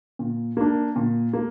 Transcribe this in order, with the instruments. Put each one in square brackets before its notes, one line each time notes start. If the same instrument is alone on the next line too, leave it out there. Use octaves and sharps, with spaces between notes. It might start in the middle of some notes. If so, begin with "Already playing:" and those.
[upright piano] A#2
A#3 D4
A#2
A#3